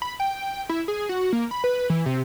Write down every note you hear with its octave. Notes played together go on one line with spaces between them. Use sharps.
B5
G5
E4
G#4
F#4
A#3
B5
B4
E3
C3